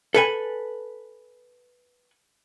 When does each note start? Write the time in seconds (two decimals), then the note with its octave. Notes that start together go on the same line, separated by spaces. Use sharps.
0.14 A4 B4 G#5